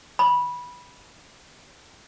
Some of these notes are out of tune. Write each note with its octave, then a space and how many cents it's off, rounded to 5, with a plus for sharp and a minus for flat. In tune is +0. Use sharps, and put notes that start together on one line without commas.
B5 -15